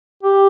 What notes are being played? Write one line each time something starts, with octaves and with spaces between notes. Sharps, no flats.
G4